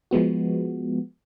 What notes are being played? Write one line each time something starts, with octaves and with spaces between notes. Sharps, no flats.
F3 G#3 B3 F#4